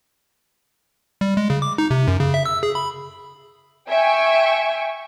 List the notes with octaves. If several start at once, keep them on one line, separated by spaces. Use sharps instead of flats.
G3
G#3
C#3
D6
D#4
C3
F#2
C#3
E5
E6
G#4
B5
E5 G5 G#5 C#6